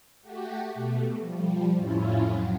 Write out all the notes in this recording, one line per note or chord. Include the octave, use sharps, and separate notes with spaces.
A3 F#4 G4
B2 A3
F3 G3
F2 A2 C#4 E4 F4
F2 F#3